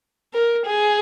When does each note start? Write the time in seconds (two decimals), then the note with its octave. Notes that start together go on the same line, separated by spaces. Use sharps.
0.33 A#4
0.65 G#4